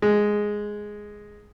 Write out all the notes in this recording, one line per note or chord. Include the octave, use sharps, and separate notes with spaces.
G#3